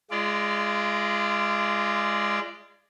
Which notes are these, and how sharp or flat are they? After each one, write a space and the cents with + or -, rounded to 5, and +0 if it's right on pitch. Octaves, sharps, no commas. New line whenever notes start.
G#3 +0 F4 -35 D5 +0